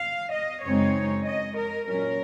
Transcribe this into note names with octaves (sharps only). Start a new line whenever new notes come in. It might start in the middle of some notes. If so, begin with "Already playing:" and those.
Already playing: F5
D#5
F#2 C#3 G#3 C4 D#4 C#5
D#5
A#4
A#2 F#3 C#4 A#4